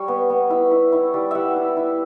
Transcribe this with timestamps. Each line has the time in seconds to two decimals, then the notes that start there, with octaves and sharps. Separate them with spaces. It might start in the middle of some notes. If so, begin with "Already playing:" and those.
Already playing: G3 C#5
0.08 B3
0.30 B3
0.50 E4
0.71 E4
0.92 E4 C#5
1.14 G3 D5
1.31 G3 E5 F#5
1.56 E4
1.77 E4